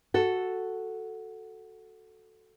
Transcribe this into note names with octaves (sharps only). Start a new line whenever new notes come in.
F#4 A4